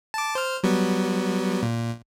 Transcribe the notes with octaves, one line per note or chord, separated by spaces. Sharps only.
A5 D6
C5 F6
F#3 G3 B3
A#2